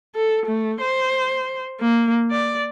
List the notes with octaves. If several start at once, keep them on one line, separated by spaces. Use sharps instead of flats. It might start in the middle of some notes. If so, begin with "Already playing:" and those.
A4
A3
C5
A#3
D5